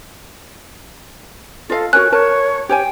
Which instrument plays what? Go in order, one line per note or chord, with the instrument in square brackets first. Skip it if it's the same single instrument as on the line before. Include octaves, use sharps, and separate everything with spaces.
[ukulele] F4 D#5 F5 [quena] A4
[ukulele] F#4 A#4 G#5 [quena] C#5 [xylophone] F#6
[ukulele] A#4 A5 [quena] C#5
[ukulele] G4 C#5 G#5 [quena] G5